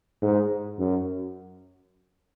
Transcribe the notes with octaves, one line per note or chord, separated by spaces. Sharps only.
G#2
F#2